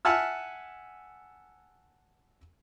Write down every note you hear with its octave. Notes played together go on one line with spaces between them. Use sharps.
E5 F#5 G#5 A5 E6 F6